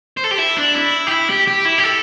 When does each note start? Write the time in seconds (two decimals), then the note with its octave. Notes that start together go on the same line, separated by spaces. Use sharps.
0.17 C5
0.24 A4
0.31 G4
0.38 E4
0.57 D4
0.75 E4
1.07 G4
1.12 E4
1.30 G4
1.48 G4
1.65 E4
1.79 G4
1.84 A4